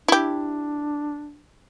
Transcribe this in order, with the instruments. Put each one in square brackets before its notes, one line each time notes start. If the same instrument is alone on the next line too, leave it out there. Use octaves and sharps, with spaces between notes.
[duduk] D4 [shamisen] E4 G4